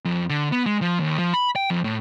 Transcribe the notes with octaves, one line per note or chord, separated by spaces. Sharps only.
F2
D3
B3
G#3
F3
D#2
F3
B5
G5
F2
A2